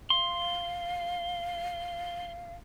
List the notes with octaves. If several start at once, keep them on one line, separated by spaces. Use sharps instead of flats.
F5 C6